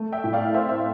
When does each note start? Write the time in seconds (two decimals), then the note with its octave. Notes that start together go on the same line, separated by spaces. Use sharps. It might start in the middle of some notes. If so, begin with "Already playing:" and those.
Already playing: A3
0.12 E5 G5
0.24 A2
0.33 D5 F5
0.54 C4 C5 E5
0.69 C5 E5